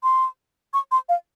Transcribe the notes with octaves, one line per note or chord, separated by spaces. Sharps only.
C6
C#6
C6
F5